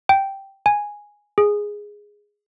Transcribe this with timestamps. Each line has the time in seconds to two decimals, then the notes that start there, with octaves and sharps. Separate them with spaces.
0.09 G5
0.66 G#5
1.38 G#4